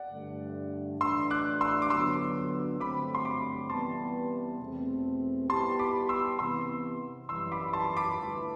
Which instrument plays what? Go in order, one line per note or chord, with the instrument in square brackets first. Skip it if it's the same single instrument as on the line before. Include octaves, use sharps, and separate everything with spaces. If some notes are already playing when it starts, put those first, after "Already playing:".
Already playing: [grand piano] D5 F#5
[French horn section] G2 D3 A3
[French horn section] A2 E3 A3 D4 [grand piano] C6 E6
[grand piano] D6 F#6
C6 E6
D6
[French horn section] D3 F#3 B3 [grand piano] C6 E6
[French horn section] G2 D3 F#3 A3 C4 [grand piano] B5 D6
[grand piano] C6
B5 D6
[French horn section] C3 E3 G3 B3 [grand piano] A5 C6
[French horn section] E2 B2 A3 C4
[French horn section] G3 B3 E4 G4 [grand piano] A5 C6
[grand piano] B5 D6
C6 E6
[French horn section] C3 E3 B3 [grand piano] C6 E6
[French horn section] F#2 E3 G3 [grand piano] C6 E6
[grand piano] B5 D6
A5 C6
B5 D6
[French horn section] D3 A3 E4 B4